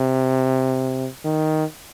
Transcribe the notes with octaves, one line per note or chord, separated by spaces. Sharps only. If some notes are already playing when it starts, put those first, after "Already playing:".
Already playing: C3
D#3